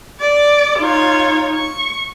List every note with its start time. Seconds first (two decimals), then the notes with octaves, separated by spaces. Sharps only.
0.20 D5
0.80 D#4 F4 C#5
1.55 C#6